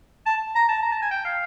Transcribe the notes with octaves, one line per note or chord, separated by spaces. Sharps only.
A5
A#5
A5
A#5
A5
G#5
G5
F5